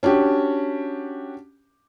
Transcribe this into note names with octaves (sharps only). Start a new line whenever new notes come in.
C#4 D4 F#4 G4